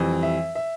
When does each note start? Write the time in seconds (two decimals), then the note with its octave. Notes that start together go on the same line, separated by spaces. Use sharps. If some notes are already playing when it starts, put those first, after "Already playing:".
Already playing: F2 E3 G3
0.23 E5
0.55 E5